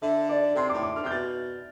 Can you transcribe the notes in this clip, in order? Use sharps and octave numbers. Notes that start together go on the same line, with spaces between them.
D3 E5
D5
C3 C6
D6
A2
D6
D3 F6
C3
G6
B2 A6